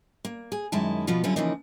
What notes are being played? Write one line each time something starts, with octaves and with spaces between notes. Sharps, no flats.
A#3
G#4
F#2 D#3 G#3 E4 A5
B2 F3 B3 F4 F#4
D3 F#3 G3 C#4 E4 F4
C#3 E3 F3 A#3 D#4